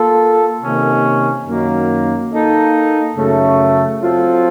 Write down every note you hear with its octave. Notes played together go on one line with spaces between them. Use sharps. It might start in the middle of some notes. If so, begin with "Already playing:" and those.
Already playing: A#3 F4 A4
C3 D#3 A#3 C#4
F#2 D#3 A#3
A#3 D#4 A4 D#5
F#2 C#3 A3
F#3 C4 F4 A4